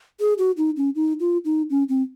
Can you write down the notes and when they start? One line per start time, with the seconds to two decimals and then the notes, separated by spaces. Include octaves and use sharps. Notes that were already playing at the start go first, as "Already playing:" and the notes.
0.20 G#4
0.38 F#4
0.57 D#4
0.77 C#4
0.95 D#4
1.20 F4
1.45 D#4
1.70 C#4
1.89 C4